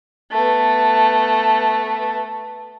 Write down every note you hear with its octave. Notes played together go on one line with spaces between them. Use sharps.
A3 B3